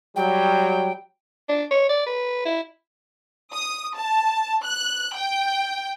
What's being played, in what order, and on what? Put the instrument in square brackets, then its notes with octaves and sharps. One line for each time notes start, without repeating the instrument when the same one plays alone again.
[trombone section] F#3 G3 [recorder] G5
[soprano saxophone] D4
C#5
D5
B4
E4
[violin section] D#6
A5
F#6
G5